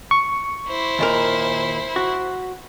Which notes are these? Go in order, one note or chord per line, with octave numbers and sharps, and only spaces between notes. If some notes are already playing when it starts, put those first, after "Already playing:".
C#6
E4 C5
D#2 A#2 A#4
F#4